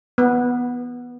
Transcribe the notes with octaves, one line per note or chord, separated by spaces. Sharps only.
B3